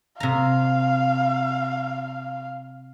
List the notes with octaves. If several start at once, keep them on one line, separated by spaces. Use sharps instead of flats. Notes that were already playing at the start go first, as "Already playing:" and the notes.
C3 F5 A#5